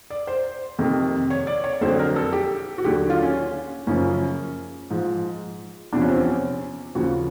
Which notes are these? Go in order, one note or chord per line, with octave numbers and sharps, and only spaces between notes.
D5
C5
F2 C3 D#3
C#5
D5
C#5
F2 D3 F#3 C5
A#4
A4
G4
F#4
D#2 D3 F#3 G4
F4
C#4
F#2 C#3 F3 C#4
G#2 F3
E2 C3 F3 D4
C#4
C4
C#4
D#2 C#3 F3 F#4